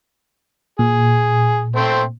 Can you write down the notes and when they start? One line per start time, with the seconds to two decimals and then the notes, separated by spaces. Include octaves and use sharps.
0.79 A#2 G#4
1.76 A3 C4 C5